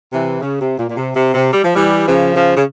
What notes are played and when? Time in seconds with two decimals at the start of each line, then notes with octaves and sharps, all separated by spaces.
0.12 C3 E3
0.40 C#3
0.59 C3
0.77 A#2
0.88 A#2
0.95 C3
1.14 C3
1.33 C3
1.51 G3
1.63 F3
1.74 E3 G3
2.06 C#3 F3
2.34 C#3 F3
2.55 C#3